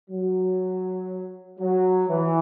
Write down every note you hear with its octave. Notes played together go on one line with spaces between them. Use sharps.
F#3
F#3
E3